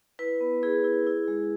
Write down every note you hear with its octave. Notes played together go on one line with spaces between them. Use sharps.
E4 B4
B3
E4 G#4
E4
E4
G#3